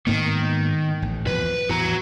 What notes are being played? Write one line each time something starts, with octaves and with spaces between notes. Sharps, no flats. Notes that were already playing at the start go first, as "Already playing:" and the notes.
G#2 D#3 A#3 B3
A1
A#1 E2 F3 B4
E2 A2 F#4 A#5